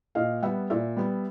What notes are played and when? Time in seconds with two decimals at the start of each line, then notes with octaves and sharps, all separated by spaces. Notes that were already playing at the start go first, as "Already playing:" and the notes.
0.15 A#2 D#5 F5
0.42 G3 B3 E5 F#5
0.70 A#2 D5 E5
0.97 G3 B3